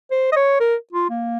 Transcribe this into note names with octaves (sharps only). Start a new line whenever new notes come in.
C5
D#5
C#5
A#4
F4
A#3